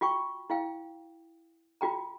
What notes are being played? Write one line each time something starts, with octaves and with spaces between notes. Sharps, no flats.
F4 F#4 G5 C#6
E4 F5 G5
F4 F#4 G5 A#5